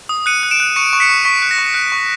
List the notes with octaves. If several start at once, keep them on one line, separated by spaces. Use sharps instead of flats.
D#6
F#6 C#7 D#7
F#6
D7 E7
F#6
C#6 C#7 D#7
C#6
B6 C#7
C#6
C#6 B6
F#6
A#6
C#6
F#6
C#6